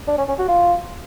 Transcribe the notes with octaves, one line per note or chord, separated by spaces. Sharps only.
D4
C#4
C#4
F#4
F4